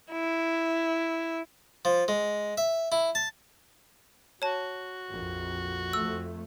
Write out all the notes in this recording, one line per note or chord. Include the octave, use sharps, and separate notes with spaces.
E4
F3
G#3
E5
E4
A5
F#4 C#5 A5
A#1 F2
F2 A3 E6